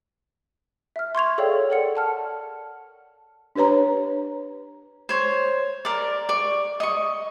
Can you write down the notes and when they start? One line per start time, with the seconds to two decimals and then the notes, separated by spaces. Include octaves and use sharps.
0.96 E5 F6
1.15 C6 C#6 G#6 F7
1.38 G#4 A4 C#5 D5 F5 G5
1.70 A4 A#4 D5 F#5 C#7
1.95 F#5 A5 F6
3.56 D4 G4 B4 C#5 A#5
5.09 C5 C#5
5.85 A#4 D5
6.29 D5 C#6
6.80 D#5 C#6